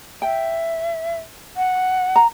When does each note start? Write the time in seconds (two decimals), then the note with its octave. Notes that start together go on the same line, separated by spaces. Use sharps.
0.22 E5 G5
1.57 F#5
2.16 A#5